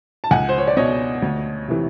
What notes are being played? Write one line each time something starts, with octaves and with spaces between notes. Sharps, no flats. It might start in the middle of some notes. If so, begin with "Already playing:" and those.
A5
C#2 F#5 G#5
C5
C#5
D5
B2 C#5 D#5
D2
C3 E3